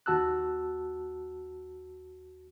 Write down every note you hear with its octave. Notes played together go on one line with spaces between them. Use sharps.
D#2 F#4 A5 E6 F#6